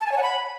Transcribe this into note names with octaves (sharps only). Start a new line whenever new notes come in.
A5
G#5
C#5
F#5
B5